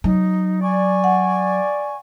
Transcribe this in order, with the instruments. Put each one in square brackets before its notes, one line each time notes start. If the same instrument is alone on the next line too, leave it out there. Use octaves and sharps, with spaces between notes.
[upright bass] F#3 [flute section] D#4
[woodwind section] D5 [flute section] G#5 C#6
[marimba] F#5